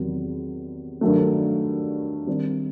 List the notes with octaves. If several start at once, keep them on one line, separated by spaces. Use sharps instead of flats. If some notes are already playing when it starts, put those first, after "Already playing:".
Already playing: E2 C3 D#3 F#3
G2 D#3 F#3 A3
D#3 G3 C4